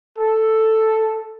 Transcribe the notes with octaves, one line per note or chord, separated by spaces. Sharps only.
A4